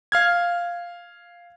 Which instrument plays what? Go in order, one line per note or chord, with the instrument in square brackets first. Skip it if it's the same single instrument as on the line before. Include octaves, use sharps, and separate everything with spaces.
[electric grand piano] F5 F6 G#6